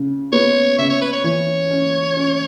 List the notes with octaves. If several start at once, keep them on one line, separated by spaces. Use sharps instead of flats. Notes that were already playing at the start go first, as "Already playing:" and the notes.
Already playing: C#3
B3 C#5
C#3 E5
C#5
B4
C#5
E3 C#5
C#4
C#4